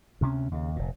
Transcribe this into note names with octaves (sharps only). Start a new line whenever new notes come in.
D2 C3 A3 C#4
D#2 C#3
F1 A#2